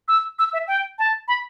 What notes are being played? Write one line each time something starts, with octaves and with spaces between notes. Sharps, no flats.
E6
E6
E5
G5
A5
B5